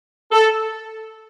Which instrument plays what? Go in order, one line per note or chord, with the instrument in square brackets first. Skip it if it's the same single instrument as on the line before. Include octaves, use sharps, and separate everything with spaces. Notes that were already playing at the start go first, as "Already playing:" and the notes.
[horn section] A4